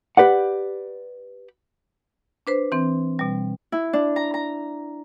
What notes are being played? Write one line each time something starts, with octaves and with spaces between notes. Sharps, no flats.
G4 B4 D5 F#5
D4 B4 C5
E3 C4
B2 G3
E4
D4
A#5
A#5